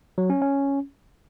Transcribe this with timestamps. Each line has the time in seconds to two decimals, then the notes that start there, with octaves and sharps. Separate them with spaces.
0.18 F#3
0.30 C#4
0.42 C#4